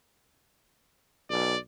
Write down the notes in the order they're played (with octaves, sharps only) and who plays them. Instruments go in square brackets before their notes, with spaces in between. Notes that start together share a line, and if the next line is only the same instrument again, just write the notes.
[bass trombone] B1 [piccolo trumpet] D5